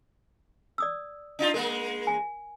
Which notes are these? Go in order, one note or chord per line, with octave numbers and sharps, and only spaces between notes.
D5 D#6 E6
D4 D#4 F4
G#3 A#3 A#4
G#5